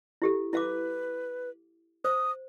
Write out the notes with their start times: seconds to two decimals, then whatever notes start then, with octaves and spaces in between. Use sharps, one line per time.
0.22 E4 G4 A4
0.53 E4 B4 F5 D6
2.04 C5 D#6